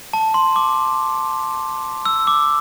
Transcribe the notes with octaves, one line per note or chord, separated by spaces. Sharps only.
A5
C6
D6
E6
D6